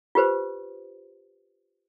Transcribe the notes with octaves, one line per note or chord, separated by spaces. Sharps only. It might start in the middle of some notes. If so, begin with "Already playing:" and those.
F4 G4 B4 C5